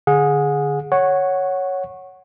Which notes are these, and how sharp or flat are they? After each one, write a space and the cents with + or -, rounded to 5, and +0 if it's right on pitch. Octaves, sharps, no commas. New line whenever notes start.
D3 +0 G#4 +0 F#5 -35
C#5 +0 F#5 +0 C#6 -15